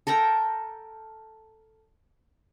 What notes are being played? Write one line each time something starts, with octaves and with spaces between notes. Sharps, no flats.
A4 A#4 G5 A#5